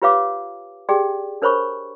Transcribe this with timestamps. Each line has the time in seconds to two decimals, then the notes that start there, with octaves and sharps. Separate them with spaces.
0.02 F4 G4 B4 C#5 F5 D6
0.89 G4 G#4 D5 G5
1.42 D4 A#4 C5 C#5 B5 C#6